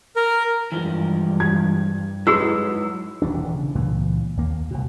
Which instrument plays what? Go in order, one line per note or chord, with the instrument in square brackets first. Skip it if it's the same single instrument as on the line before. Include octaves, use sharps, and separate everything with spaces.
[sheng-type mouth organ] A#4
[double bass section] G2 [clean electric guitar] E3 F3 G#3
[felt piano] G#6
[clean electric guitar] G#2 B4 D#5 [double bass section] F#3 [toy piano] E4 F#4 G#4 [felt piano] E6
[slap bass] D#1 B1 E3 D4
C#3
C#2 A#2 E3
D#2 A#3
C2 B2